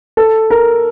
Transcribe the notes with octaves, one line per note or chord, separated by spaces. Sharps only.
A4
A#4